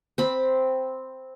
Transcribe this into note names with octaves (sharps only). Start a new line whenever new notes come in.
C4 B5